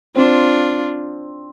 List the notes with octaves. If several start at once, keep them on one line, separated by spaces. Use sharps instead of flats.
C4 D4 F4